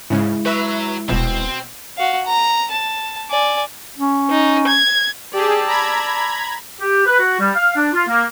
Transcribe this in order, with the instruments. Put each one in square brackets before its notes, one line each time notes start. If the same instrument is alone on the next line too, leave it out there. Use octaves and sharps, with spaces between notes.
[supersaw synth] G#2 C#3 [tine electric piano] G#3 E4
[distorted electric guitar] F#3 [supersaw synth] B4 E5
[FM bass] D#1 [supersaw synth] B2 [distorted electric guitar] C4
[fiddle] F#4 F5
A#5
A5
D5 G#5
[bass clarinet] C#4
[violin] D#4
G#6
[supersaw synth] G4 G#4 [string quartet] D5 A5 E6
[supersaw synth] A#5 B5 G#6
[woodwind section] G4
B4
F#4
G3
F5
D4
F4
A#3